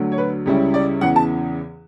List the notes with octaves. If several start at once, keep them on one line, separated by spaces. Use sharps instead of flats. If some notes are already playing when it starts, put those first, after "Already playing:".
Already playing: D2 D3 F#3
C#5
B4
C#2 C#3 G3 C#4 E4
D5
E2 C#3 E3 F#5
A5